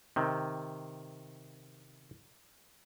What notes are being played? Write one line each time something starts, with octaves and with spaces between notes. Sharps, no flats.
C3 D#3